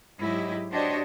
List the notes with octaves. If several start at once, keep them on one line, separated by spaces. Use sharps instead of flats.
G#2 F#3 E4 G4 D#5
D4 F#4 G4 C5 C#5 D#5